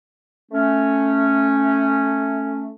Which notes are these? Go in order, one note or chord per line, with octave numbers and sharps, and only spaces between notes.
A3 C#4